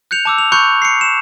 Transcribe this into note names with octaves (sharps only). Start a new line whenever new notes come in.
F#6 G6 C#7 F7
A5 D6 E6
F7
B5 C#6 F#6 G6 C#7 F7
C7 C#7
E7